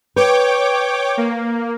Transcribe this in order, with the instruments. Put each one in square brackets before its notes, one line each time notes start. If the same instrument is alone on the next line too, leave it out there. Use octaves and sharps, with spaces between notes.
[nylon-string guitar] B4 [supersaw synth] C#5 G5 D6
[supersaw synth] A#3